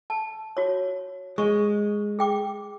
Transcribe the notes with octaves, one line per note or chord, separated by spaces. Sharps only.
A5
F#4 C#5
G#3 C#6
G#4 G5 D6